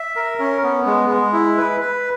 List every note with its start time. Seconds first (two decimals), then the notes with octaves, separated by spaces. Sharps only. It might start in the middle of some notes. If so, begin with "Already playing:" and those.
Already playing: E5
0.16 A#4
0.39 C#4
0.63 B3
0.86 G#3
1.09 G#3
1.33 E4
1.57 B4
1.81 B4